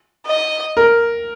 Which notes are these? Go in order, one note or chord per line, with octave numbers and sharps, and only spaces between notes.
D#5
A#4